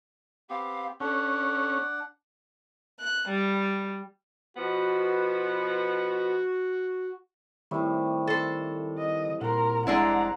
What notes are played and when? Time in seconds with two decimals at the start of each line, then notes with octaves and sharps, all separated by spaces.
0.50 B3 C4 G4 F5
1.00 C#4 D4 A4 F#5
3.00 F#6
3.29 G3
4.57 B2 F3 B3 F#4
7.71 A2 C3 D#3 G3
8.27 A4 C5
8.98 D#5
9.41 A#2 A#4 F#5 C6
9.87 F1 G#3 D4 E4 C5 F#5 A#5